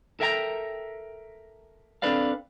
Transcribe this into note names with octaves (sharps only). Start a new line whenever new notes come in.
A4 A#4 E5 G5 G#5 A#5
C4 D4 A4 B4 D5 F5